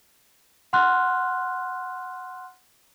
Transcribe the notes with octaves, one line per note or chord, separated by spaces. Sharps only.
F#5 C6 F6 F#6